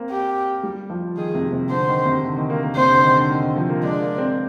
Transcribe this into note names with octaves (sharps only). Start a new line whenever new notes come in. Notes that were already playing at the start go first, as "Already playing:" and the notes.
Already playing: A#3 C4
G4
G3
F3
D#3 G#4
C3
C3
D3 C5
D#3
C3
D3
D#3
A#3
A#3
C3 C5
D3
D#3
D3
D#3
D#3
F3
A#3
G#3 D4
A#3
C4